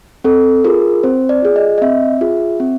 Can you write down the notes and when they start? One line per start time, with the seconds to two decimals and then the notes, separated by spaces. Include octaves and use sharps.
0.24 C4 A4
0.64 F4 G#4 A#4
1.03 C4 C5
1.29 D5
1.42 F4 G#4
1.56 D#5
1.78 D#5
1.82 C4 E5
2.21 F4 G#4
2.60 C4